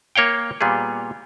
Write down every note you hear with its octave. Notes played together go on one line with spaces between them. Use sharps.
A#3 C#5 F5 G5
A#2 G3 B3 G#4